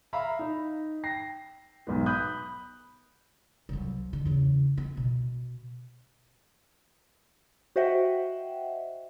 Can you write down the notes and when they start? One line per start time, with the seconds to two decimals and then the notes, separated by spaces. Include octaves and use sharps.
0.13 E5 F5 A#5 B5
0.39 D#4
1.04 G5 A#6 C7
1.87 B1 G#2 B3
2.06 B5 D#6 F#6 G6
3.69 C2 F#3
4.13 D3
4.25 E2 C#3
4.77 B3
4.97 B2
7.76 F#4 C5 D#5 E5 F#5 G5